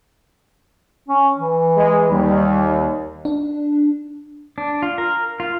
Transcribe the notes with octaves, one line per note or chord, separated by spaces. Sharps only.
C#4
E3
G#3
D#2 G3
D4
D4
F4
A#4
F4